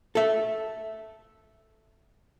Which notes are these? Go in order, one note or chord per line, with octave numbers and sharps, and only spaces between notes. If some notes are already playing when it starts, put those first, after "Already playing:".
A4 E5